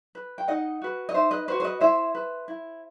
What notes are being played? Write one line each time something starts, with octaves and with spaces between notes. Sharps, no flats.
B4
G5
D#4 D#5 F#5
F#4 B4
D#5
D#4 C5 E5
B4 D#5
F#4 B4 C5
C5
B4 D#5
E4 C5 E5
B4
E4